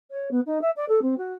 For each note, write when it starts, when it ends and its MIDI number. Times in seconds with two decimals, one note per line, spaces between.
0.10 0.28 73
0.31 0.40 59
0.45 0.60 63
0.61 0.70 76
0.76 0.85 74
0.88 0.99 69
1.02 1.17 60
1.17 1.33 66